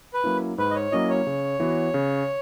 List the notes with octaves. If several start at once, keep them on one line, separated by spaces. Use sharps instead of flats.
B4
F#3 A#3 C#4 E4
G#2 B4
D#5
C#5
F#3 A#3 C#4 E4 D#5
C#5
C#3
E3 B3 F#4
C#3